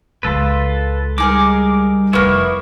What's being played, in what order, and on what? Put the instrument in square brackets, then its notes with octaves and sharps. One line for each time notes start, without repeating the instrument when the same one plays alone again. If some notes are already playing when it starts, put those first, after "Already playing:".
[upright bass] C#2 G#3 [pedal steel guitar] F4 A4 B4
[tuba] G3 [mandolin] D#4 G#4 A#4 [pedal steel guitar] D6
[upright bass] F1 F2 [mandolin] A#3 B3 [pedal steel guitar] E4 C#6